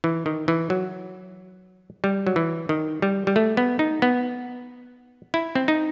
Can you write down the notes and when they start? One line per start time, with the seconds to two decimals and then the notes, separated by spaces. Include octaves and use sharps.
0.04 E3
0.26 D#3
0.48 E3
0.70 F#3
2.04 G3
2.27 F#3
2.36 E3
2.69 D#3
3.02 G3
3.27 G3
3.36 A3
3.57 B3
3.79 D#4
4.02 B3
5.34 E4
5.55 C4
5.68 D#4